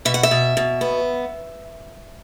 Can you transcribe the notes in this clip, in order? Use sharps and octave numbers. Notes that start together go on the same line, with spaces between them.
B2 E5
F#5
E5
B2
B2
B3